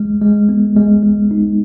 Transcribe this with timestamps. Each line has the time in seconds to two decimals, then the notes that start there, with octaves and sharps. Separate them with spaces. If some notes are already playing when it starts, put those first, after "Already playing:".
Already playing: G#3
0.22 G#3
0.49 B3
0.77 G#3
1.03 G#3
1.31 D#4